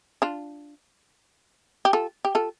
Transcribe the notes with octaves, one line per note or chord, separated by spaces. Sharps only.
D4 F4
G4
F4 A4
G4
F4 A4